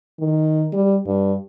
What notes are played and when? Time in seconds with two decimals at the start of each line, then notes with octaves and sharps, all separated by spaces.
0.20 D#3
0.73 G3
1.06 G2